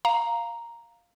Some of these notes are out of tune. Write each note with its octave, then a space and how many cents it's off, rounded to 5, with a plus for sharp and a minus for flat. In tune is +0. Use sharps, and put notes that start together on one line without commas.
F5 +0 A#5 +0